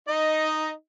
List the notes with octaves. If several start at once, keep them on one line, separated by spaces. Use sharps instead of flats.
D#4 D#5